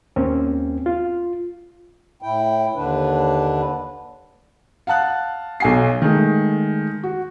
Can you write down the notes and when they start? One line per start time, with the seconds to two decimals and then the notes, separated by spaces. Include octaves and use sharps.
0.16 D#2 A#3 C4 C#4
0.86 F4
2.22 A2 E4 G5
2.75 D#2 D3 D4 B4
4.87 F5 F#5 A5 F#6
5.60 B1 G#5 C7
6.02 D#3 G#3 A3
7.03 F#4